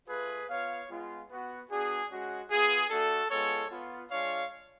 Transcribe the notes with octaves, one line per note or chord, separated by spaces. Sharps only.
A3 F4 G#4 B4
B3 F4 C#5 F5
G#3 B3 F4
B3 F#4
B3 D4 F#4 G#4
G#3 C#4 F#4
B3 F4 G#4
A3 D4 F#4 A4
G#3 B3 F4 A4 C#5
B3 F4
G#3 D4 F4 C#5 F5